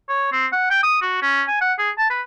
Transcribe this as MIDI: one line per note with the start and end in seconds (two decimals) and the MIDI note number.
0.09 0.30 73
0.32 0.46 60
0.52 0.70 78
0.70 0.78 79
0.83 0.98 87
1.02 1.19 66
1.22 1.43 61
1.48 1.59 80
1.61 1.74 78
1.78 1.90 68
1.98 2.07 81
2.10 2.22 71